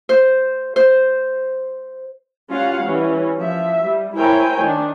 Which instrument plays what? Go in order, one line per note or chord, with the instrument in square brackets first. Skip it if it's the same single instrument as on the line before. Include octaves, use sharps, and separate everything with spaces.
[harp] C5
C5
[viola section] G3 C#4 F4 F5 F#5
E3 G3 C#4
F3 E5
G3
E4 A#4 C5 C#5 G5 G#5
D#3 D4